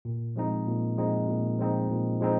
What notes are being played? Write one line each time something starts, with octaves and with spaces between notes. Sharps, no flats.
A#2
F3 G#3 C4 D#4
A#2
F3 G#3 C4 D#4
A#2
F3 G#3 C4 D#4
A#2
F3 G#3 C4 D#4